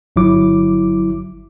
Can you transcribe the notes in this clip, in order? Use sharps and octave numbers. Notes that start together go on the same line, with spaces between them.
G1 F#3 E4 D6